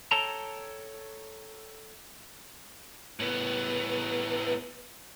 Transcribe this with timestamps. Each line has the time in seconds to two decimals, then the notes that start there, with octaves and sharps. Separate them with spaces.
0.11 A4 C#5 G5 A5 A#5
3.20 A2 B3